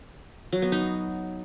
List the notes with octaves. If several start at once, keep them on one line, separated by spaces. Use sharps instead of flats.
F#3
B3
D#4